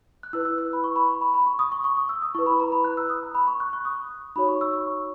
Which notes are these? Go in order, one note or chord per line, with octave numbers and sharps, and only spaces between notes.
F#6
E4 B4 E6
E6
E6
B5
C#6
B5
C#6
B5
B5
C#6
D#6
C#6
C#6
D#6
E6
D#6
E4 B4 C#6
B5
A#5
B5
F#6
E6
D#6
A#5
B5
C#6
F#6
C#6
D#6
D#4 F#4 C#5 B5
C#6
E6
C#6